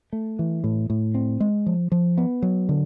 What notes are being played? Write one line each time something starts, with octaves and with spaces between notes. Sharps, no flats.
A3
E3
A2
A2
C4
G#3
F3
F3
B3
F#3
D3